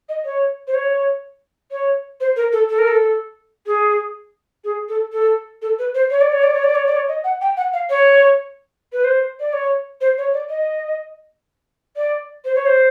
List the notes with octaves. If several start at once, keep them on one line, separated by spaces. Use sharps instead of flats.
D#5
C#5
C5
C#5
C#5
C5
A#4
A4
A4
A#4
A4
G#4
G#4
A4
A4
A4
B4
C5
C#5
D5
C#5
D5
C#5
D5
C#5
D5
C#5
D#5
F#5
G5
F#5
F5
C#5
B4
C5
D5
C#5
C5
C#5
D5
D#5
D5
C5
C#5
C5